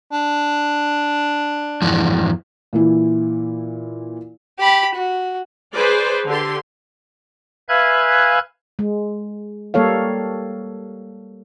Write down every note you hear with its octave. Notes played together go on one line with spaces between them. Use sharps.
D4
F2 G#2 E3
A#2 E3 E4
G4 B5
F#4
G#4 B4 C5 D5
D3 G4 C6
B4 E5 F5 G#5 F#6 G#6
G#3
G3 A#3 A4 C#5 F5